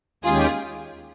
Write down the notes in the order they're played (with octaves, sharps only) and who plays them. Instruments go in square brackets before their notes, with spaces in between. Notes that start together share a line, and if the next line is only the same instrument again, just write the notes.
[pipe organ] D#2 D#3 G#3 C#4 G4 [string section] F4 G#4